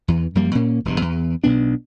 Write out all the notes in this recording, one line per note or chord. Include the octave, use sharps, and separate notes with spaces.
E2 E3
F#2 F3 G3 A#3
A#2 A#3 C#4
E1 G2
E2
B1 B2 B3 D4